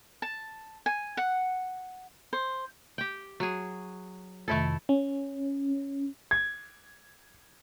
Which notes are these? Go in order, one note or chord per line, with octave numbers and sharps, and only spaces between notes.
A5
G#5
F#5
C5
G4 G5
F#3 G#4
F2 C3 D#3 A3 E4 A4
C#4
G#6